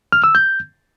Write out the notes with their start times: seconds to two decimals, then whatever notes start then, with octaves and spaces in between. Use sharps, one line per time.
0.12 F6
0.24 E6
0.35 G6